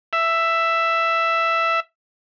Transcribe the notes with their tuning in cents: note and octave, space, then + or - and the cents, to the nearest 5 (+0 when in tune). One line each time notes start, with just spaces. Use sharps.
E5 +5